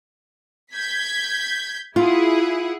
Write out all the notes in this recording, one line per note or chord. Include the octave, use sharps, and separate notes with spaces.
G6 G#6 B6
E4 F4 G#4 F#5